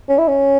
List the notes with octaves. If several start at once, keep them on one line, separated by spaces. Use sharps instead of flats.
C#4
E4
C#4